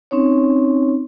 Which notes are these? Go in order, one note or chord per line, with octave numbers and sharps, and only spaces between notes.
C4 C#4 D#4 C#5